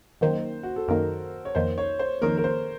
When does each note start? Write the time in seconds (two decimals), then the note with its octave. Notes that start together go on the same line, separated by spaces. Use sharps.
0.21 F#2 D#3 A#3 C5
0.63 F#4
0.76 A4
0.88 F#2 D#3 A#3 A#4
1.45 C#5
1.55 F2 D#3 A#3 C5
1.78 C#5
1.99 C5
2.22 F2 D#3 A#3 A#4
2.37 A#4
2.44 C5